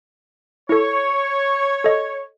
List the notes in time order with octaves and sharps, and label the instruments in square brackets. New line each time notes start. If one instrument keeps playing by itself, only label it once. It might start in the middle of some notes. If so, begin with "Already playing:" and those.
[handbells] E4 A4 [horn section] C#5
[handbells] A4 D#5